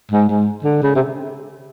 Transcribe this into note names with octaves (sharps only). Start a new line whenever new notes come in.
G#2
G#2
D3
C#3
C3